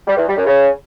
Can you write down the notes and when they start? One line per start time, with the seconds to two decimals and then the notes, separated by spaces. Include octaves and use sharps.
0.07 G3
0.17 E2
0.27 G3
0.37 F#2
0.47 C#3